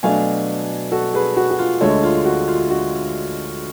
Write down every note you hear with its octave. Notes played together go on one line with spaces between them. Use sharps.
B2 F#3 A3 D4 F5 G#5
F#4 A4
G#4 B4
F#4
F#4
F4
D2 D3 G#3 A4 C#5
F4
F#4
F4
F#4